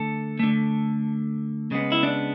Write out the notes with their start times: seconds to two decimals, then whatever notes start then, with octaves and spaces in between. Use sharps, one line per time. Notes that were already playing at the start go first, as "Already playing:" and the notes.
Already playing: D3 A3 A4
0.39 D3 A3
1.71 C#3 G#3 B3
1.92 E4
2.03 D4